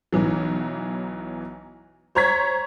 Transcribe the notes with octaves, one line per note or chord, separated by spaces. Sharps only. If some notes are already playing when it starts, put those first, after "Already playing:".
B1 E3 F#3
C5 C#5 A#5 C#6 G#6 B6